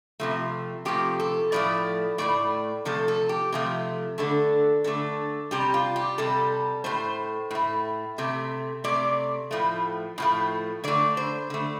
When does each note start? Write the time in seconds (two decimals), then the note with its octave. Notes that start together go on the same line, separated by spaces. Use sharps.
0.20 C3 F3 A3
0.85 C3 F3 A3 G4
1.20 A4
1.52 A2 F3 A3 D5
2.18 A2 F3 A3 D5
2.85 C3 F3 A3 A4
3.08 A4
3.29 G4
3.52 C3 F3 A3
4.18 D3 A3 A4
4.84 D3 A3 A4
5.51 C3 G3 G4
5.74 F4
5.96 G4
6.18 C3 G3 A4
6.84 A2 A3 C5
7.51 A2 A3
8.18 C3 A3
8.84 C3 A3 D5
9.51 A2 F3 A3
10.18 A2 F3 A3
10.84 D3 A3 D5
11.17 C5
11.50 D3 A3